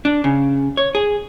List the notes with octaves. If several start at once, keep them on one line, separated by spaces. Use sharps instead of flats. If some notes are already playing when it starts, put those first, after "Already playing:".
D4
C#3
C#5
G#4